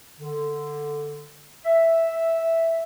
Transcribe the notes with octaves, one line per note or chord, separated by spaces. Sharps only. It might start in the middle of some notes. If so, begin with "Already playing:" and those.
D3
E5